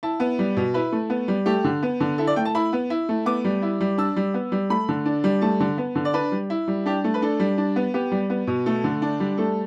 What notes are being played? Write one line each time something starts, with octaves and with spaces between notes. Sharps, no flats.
E4 A5
B3
G3
B2
E4 B4
A3
B3
G3
A3 G4
D3
B3
D3
E4 A4
D5
A3 G5
A5
E4 B5
B3
E4
A3
B3 D6
G3
E4
G3
D4 E6
G3
B3
G3
A3 B5
D3
D4
G3
A3 A5
D3
B3
D3
D5
D4 B4
G3
E4
G3
D4 G4
A3
B4
D4 A4
G3
D4
B3
B3 G4
G3
B3
B2
A3 A4
D3
D4
G3
A3 A4